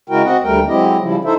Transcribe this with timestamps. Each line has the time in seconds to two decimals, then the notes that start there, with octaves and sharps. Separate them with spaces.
0.10 C#3 G#3 E4 F#4 A#4 G5
0.24 C4 F#4 D#5 F#5
0.43 D2 G3 A3 A#4 G5
0.68 F#3 G#3 C4 E4 G4 D#5
1.01 C#3 F3 G3 E4
1.24 D#4 E4 A4 C5 E5